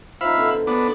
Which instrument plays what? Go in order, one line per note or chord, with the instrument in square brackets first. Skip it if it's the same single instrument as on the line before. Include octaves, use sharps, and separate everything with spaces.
[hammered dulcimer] F3 D#4 [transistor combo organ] E5 F5 B5
[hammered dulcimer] B2 D3
D3
[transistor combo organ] B3 D4